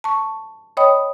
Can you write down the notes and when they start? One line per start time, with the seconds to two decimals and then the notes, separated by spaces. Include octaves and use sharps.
0.04 A5 C#6
0.77 C#5 D#5 G5 B5 D#6